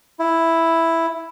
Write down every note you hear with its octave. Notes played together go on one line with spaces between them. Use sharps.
E4